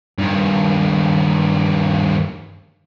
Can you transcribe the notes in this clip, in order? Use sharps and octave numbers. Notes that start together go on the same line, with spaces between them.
G2 D#3